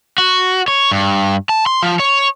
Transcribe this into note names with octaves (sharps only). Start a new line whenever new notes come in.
F#4
C#5
G2
A5
C6
F3
C#5